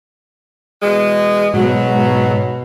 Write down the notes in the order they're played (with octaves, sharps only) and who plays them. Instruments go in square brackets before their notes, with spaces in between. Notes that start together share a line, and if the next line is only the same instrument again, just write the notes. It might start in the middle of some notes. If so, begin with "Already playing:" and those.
[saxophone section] B2 E3 G#3
[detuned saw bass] G#2 [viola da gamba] B2 [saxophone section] F#3